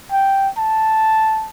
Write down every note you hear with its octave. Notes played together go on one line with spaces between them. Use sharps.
G5
A5